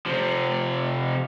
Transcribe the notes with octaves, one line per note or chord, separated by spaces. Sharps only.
C3 F3